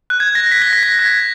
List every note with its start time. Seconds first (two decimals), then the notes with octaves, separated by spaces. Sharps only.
0.10 F#6
0.20 G#6
0.35 A#6
0.52 B6
0.62 A#6
0.73 B6
0.83 A#6
0.95 A#6
0.99 G#6